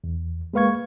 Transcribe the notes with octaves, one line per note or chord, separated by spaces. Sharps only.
E2
G#3 A#3 B4 F5 C#6 G#6